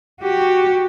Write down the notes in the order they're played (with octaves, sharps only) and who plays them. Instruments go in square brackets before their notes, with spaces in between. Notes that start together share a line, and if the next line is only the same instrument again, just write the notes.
[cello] F#4 G4